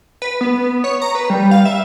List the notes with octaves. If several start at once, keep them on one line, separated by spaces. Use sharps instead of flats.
B4
B3
C#5
A#5
B4
G3
F5
E5